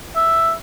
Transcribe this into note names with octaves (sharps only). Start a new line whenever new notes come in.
E5